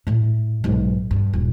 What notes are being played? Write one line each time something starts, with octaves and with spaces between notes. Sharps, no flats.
A2 A3
B1 G#2
G2
D#1